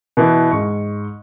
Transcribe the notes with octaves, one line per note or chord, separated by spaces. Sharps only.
B2 E3
G#2 C#6